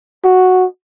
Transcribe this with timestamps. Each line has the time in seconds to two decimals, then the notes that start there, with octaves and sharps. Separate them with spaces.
0.24 F#4